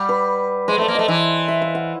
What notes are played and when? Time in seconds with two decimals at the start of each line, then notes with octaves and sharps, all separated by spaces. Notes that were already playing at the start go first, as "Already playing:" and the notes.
Already playing: G3 F#5
0.09 B4
0.68 G#3 C5
0.78 A3 D5
0.88 A#3
0.95 A3 D#5
1.08 E3 E5
1.48 E5
1.62 F5
1.75 F#5